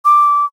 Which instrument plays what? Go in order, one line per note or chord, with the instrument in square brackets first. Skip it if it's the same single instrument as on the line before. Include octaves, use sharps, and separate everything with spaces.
[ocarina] D6